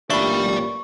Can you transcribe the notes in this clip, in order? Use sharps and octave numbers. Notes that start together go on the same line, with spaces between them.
A1 A#2 D4 G4 D5 E5 B5 C#6